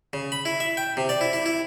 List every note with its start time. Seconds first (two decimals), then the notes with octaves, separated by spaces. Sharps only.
0.13 C#3
0.32 B5
0.45 E4
0.60 E5
0.77 G5
0.97 C3
1.09 D5
1.21 E4
1.33 E4
1.46 E4